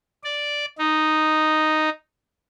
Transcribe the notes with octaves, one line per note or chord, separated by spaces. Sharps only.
D5
D#4